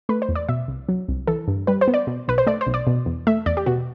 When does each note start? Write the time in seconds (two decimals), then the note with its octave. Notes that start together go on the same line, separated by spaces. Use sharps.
0.09 A3 B4
0.22 C5
0.29 E2
0.35 D5
0.49 B2 E5
0.68 C2
0.89 F#3
1.09 C2
1.27 E3 A4
1.48 G2
1.67 G3 B4
1.81 C5
1.88 B3
1.94 D5
2.07 B2
2.28 B1 B4
2.38 C5
2.47 A3 D5
2.61 C5
2.67 B1
2.74 D5
2.87 B2
3.06 E2
3.27 A3 E5
3.46 E2 D5
3.57 G4
3.66 B2 F#4